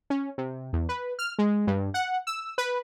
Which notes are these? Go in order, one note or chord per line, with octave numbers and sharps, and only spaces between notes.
C#4
C3
E2
B4
F6
G#3
G2
F#5
E6
B4